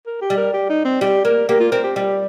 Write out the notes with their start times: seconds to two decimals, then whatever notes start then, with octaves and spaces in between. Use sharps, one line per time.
0.06 A#4
0.21 G4
0.30 G3
0.37 A#4
0.54 G4
0.69 D#4
0.85 C4
1.01 G3 G4
1.25 A#3 A#4
1.49 A#3 G4
1.60 F4
1.72 C4 A#4
1.84 G4
1.96 G3 G4